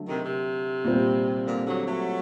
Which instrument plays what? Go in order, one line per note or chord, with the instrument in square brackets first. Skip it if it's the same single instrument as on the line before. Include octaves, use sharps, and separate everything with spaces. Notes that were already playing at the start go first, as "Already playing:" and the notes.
Already playing: [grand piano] D3 F#3 A3
[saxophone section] C3 D#3
C3
[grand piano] A#2 G3 C4
[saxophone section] A#2 D3
D3 F#3
F#3 A3